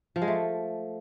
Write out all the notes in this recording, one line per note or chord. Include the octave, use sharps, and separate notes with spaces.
F3
G#3
A3